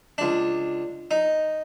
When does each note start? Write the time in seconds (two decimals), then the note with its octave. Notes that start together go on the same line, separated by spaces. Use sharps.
0.18 C#2 D4
1.11 D#4